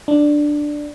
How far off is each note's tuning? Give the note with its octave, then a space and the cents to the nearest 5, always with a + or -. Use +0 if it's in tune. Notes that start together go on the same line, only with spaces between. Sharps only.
D4 +5